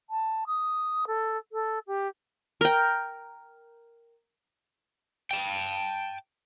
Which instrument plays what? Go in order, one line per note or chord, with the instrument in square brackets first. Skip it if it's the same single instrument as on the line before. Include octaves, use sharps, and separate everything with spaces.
[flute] A5
D#6
A4
A4
G4
[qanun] A#4 G5
[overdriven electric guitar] G5 A5